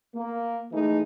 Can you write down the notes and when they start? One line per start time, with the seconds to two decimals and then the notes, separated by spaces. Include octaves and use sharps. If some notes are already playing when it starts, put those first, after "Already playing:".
0.16 A#3
0.72 E3 G#3 A3 D#4